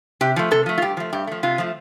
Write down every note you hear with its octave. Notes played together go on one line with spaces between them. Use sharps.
C3 G4
F3 A3
C3 A4
F3 A3
F4
G2 G4
F3 A3
G2 G4
F3 A3
C3 F4
F3 A3